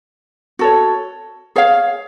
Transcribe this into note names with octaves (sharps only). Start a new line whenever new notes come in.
F#4 A4 C#5
G#4 C#5 F5